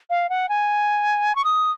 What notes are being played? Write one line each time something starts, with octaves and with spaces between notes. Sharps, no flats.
F5
F#5
G#5
C#6
D#6